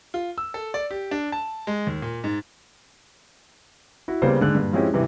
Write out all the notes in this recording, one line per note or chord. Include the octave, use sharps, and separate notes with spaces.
F4
E6
A4
D5
G4
D4
A5
G#3
D#2
A#2
G#2
E4 F#4
C#3 G3 A#3 B3 C5
G#2 D3 G#4 F#6
G2 A#2
F3 G#3 C4 C#4 E4 G4
G2 C3 E3